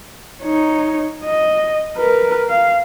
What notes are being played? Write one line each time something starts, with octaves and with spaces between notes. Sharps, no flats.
D#4 C#5
D#5
A#4 B4
F5